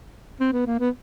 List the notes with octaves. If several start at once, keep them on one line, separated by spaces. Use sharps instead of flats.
C4
B3
A#3
B3